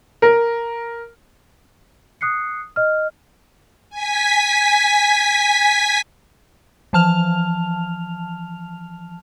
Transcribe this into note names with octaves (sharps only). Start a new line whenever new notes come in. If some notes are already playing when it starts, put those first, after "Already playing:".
A#4
D#6 F#6 C7 C#7
D#5 F6
G#5 B6
E3 F3 A5 F6 F7